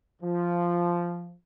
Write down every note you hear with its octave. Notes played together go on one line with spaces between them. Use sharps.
F3